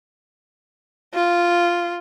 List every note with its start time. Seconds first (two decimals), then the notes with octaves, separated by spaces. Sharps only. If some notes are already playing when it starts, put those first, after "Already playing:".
1.14 F4